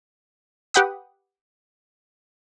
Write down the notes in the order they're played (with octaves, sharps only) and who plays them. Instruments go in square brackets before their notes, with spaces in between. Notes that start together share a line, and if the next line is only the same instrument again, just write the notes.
[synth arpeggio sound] G4 B4 F#5 G5 B5 D#6